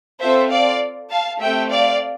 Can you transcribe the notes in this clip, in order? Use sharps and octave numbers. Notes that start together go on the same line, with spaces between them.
C4 F4 A4 C5 E5
D5 F5
F5 A5
A3 C4 G4 E5 G5
D5 F5